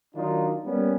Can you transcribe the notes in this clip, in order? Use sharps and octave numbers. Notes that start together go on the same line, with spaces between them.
D#3 F#3 D4 D#4 F4
G3 A#3 B3 C#4